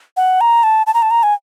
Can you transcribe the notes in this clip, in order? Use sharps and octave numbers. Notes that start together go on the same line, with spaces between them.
F#5
A#5
A5
A5
A#5
A5
A#5
G#5